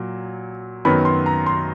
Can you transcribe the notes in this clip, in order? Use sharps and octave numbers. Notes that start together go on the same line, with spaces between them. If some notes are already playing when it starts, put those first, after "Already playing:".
Already playing: A#2 F#3
F#2 D#3 F#3 B3 B5
C6
A#5
C6